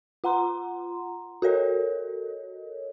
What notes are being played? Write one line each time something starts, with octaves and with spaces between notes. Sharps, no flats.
F4 F#5 A#5 C6
F#4 A4 A#4 C#5 D#5